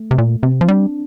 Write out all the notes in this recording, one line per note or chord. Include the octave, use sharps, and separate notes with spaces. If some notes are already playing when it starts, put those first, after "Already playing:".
Already playing: A3
C3
A#2
C3 C4
F3
G3 D4